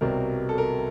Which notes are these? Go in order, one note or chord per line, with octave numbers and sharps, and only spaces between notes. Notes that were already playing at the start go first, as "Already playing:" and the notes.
C2 B2 G3 C4 A#4
A4
A#4